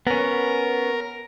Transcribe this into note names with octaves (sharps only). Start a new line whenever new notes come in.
B3 C#4 A#4